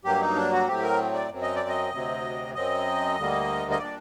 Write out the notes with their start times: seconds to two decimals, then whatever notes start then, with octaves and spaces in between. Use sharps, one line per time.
0.04 G2 F#3 A#3 G4
0.21 D#4
0.36 D4
0.52 F#4
0.67 A2 F#3 A3 C4 G4
0.83 A#4
1.14 D5
1.29 F#2 F#3 C4
1.42 D#5
1.56 D5
1.69 D#5
1.92 D2 C3 F#3 C4
2.54 F#2 F#3 C4 D#5
3.17 D2 D3 G3 A#3
3.71 D#5
3.79 A#2 G3 D4 D5